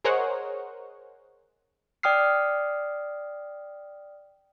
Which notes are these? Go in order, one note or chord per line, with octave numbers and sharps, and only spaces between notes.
G#4 A#4 C5 C#5 D#5 F#5
D5 G5 D#6 F6 C7